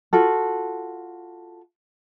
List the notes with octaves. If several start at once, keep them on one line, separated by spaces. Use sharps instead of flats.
F4 F#4 A4